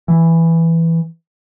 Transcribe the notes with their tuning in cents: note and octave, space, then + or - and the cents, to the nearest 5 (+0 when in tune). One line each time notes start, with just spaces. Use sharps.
E3 +5